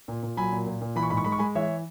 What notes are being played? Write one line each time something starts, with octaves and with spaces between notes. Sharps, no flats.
A#2
A#2
F#3 G#5 B5
A#2
A#2
A#2
E3 B5
C#6
G#2 B5
C#6
G#3 B5
C#6
G#3 G#5 B5
E3 C#5 E5